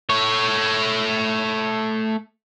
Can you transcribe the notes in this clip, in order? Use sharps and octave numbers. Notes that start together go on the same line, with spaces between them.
A3 C#5